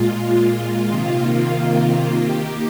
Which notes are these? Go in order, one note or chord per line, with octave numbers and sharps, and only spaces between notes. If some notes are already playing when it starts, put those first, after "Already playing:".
Already playing: A#2 G#3 F4
C3 D#3 A#3
D#3 A#3 G4